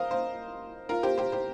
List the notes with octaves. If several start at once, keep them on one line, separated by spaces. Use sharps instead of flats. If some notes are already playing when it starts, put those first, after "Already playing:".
Already playing: A#4 C5 D#5 F5
C5 F5
F4 A#4
G4 C5
G4 C5
G4 C5